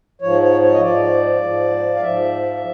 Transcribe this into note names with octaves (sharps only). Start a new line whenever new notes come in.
G#2 F3 C#5
C#5
C#5
D#5
G#2 F3 D5
G#2 F3
F5
G#2 F3 E5